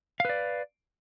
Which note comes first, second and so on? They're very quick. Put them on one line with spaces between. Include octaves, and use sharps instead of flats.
F5 B4 D5